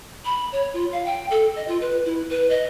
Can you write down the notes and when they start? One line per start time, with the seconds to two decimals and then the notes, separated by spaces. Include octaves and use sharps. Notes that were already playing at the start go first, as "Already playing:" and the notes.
0.25 B5
0.52 C#5
0.74 F4
0.92 F5
1.06 G5
1.31 A4
1.56 D#5
1.68 F4
1.81 B4
2.05 E4
2.30 B4
2.50 D#5